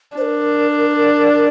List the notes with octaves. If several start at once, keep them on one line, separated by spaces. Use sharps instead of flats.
D4 A#4 C5